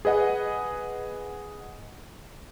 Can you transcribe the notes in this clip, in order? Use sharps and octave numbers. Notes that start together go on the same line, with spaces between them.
G#4 B4 D#5 F#5